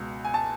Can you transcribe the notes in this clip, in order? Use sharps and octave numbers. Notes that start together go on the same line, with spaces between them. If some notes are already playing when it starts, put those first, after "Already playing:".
Already playing: C#2 B2
G#5
A5